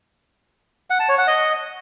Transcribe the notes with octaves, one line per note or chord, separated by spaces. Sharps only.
F#5
A5
C#5
F#5
D#5